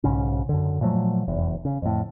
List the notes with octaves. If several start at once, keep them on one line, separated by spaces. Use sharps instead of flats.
B1 G#2 C#3 C#4
F#2 D3
A#2 F3 F#3 A3
F1 E2
C#3
F2 A2